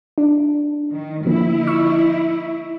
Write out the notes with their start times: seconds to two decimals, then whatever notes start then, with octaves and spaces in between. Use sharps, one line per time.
0.18 D4
0.91 D#3
1.25 D3 F3 A#3 E4
1.67 C#6 E6